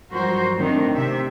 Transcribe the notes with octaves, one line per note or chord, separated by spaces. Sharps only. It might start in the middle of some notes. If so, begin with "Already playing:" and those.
G2 F3 F#3 F#4 A#4 C5
A2 D#3 C4 D4
C3 E5